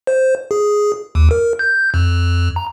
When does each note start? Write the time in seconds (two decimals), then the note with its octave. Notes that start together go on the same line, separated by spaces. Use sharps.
0.07 C5
0.51 G#4
1.15 D#2
1.31 A#4
1.59 G6
1.94 F2
2.56 A#5